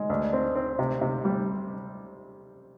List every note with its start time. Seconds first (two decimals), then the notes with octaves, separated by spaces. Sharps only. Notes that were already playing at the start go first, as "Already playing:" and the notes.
Already playing: G#3
0.10 D2
0.33 C4
0.55 C4
0.79 C3
1.01 C3
1.25 G3